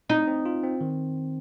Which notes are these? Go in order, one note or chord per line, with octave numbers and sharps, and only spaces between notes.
C4 D#4
C4
F4
C4
D#3